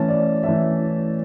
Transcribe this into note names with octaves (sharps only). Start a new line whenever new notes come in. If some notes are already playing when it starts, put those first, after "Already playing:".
Already playing: E3 A3 C#4 A5
D5
E3 A3 C#4 E5